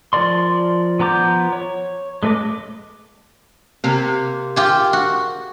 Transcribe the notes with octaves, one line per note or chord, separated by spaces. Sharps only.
F3 A#4 D5 C6
F3 B3 A#5 D6 G6
C#5
G#3 A3 B4 D#5 D6
C3 A#3
F4 G4 G#4
F#4